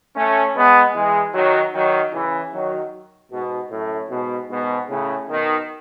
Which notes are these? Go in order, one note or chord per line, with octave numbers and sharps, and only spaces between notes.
A3 C#4
G#3 B3
E3 G#3
D#3 F#3
D#3 F#3
C#3 E3
D#3 F#3
G#2 B2
F#2 A2
G#2 B2
G#2 B2
A2 C#3
B2 D#3